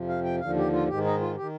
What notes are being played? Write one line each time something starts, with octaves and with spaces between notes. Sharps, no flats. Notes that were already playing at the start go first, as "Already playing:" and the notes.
Already playing: F2 C3 F3
F5
G5
D#2 D3 F3 F5
G4
F4
G#2 G4
D#3
D#4
F4
D#3 G4